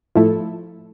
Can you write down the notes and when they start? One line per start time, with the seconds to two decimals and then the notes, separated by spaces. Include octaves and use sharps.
0.15 A2 F3 A3 E4 A4